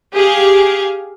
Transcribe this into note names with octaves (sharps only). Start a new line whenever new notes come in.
G4 G#4 F5